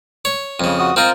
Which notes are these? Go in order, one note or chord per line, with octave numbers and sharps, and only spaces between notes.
C#5
F2 C#3
F#4 D#6
C4 F4 A#4 C5 D#5